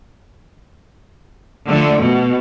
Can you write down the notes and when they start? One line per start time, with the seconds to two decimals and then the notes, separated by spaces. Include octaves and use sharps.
1.67 D3 F3 A3
2.01 B2